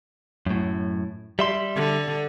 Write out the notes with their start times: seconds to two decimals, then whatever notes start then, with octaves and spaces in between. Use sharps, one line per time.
0.47 F#2 A2
1.39 G3 E5 C6
1.76 D3